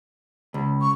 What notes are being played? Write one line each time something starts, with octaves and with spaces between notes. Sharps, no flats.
C#2
C#6